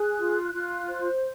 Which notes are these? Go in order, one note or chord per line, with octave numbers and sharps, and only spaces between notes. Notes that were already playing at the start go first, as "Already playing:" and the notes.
Already playing: G#4 F#6
F4
F4
C5